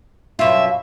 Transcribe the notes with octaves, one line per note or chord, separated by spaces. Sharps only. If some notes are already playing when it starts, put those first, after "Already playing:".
F#2 B2 F4 E5